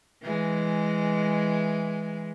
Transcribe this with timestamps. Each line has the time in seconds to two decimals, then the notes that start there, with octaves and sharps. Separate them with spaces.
0.22 E3 G#3